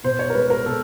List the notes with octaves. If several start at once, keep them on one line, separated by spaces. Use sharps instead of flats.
B2 C5
C#5
A#4
G#3 B4
A#4
B2 A4